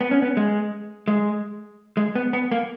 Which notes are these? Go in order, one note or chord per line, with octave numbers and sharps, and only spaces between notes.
B3
C#4
B3
G#3
G#3
G#3
B3
B3
A#3